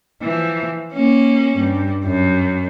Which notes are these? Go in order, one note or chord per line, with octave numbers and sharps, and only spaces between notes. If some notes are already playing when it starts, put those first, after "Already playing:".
E3 F3
A#3 C#4
G2
F#2